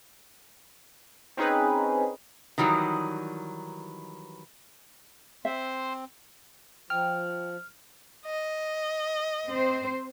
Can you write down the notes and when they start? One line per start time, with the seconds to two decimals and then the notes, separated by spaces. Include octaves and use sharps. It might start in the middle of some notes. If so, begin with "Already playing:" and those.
1.37 C4 C#4 D#4 G#4 B4
2.58 D#3 E3 F#3 G3 D#4
5.45 C4 C5 E5
6.90 F3 G5 A#5 C#6 F6
8.26 D#5
9.48 C4 C5